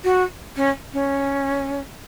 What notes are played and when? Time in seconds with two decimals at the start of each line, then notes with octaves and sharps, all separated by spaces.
0.04 F#4
0.56 C#4
0.93 C#4